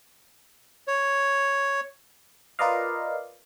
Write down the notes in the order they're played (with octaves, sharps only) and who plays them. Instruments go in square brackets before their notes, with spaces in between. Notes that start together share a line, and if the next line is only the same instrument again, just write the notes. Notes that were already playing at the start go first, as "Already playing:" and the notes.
[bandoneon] C#5
[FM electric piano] F4 A#4 B4 D5 D#5 F5